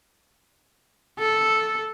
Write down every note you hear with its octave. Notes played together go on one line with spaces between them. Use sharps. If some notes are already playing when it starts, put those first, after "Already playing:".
A4